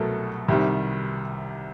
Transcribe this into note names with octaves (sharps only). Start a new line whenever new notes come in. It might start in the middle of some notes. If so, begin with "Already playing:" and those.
Already playing: C2 B2 F#3 A3 A4 A#4
C2 C3 D#3 G3